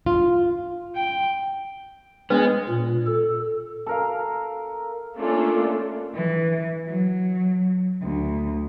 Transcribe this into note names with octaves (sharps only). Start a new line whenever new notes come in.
F4
G5
G#3 B3 D4 B4
A#2
A4
A4 A#4 F5
A3 A#3 C#4 D4 F4 A4
E3
F#3
D2